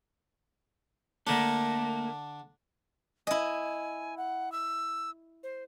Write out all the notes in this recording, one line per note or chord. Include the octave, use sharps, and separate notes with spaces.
D3 A3 A#3 D4
E4 D#5 G#5
F#5
E6
C5